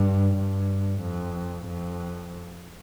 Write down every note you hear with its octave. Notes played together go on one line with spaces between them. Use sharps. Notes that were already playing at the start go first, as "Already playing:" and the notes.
Already playing: G2
G2
F2
F2